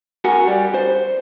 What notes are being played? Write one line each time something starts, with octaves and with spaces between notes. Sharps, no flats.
F#4 A#4 F#5 G#5
G3
C5